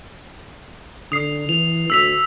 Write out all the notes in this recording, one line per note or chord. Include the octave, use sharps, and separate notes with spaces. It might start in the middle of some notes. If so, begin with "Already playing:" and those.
D3 D#6 C7
E3 F7
D2 E6 B6 F7